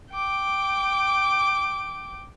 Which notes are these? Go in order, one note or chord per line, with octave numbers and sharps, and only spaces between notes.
G5 D6